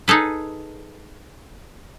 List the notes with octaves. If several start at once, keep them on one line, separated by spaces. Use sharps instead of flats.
D#4 G#4 A4 B4